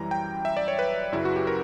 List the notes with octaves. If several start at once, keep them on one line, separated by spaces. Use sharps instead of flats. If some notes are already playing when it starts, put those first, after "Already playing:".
Already playing: F#2 E3 G3 A#5
G5
E5
D5
C#5
B4
F#2 C#3 F#3 E4
F#4
G4
A#4